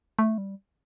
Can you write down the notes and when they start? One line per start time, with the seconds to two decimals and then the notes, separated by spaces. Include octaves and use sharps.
0.19 A3
0.38 G3